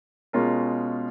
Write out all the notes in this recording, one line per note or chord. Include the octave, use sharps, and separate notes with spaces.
B2 G#3 C#4 F4 A#4